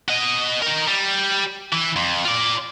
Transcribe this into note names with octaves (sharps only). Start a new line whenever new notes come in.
F#4 D#5
D#4 A#4
G3
E3
F2
F4 D5